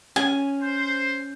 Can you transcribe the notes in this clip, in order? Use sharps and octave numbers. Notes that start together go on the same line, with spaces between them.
C#4 G#5
C5